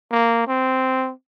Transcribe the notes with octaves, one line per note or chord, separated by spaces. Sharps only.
A#3
C4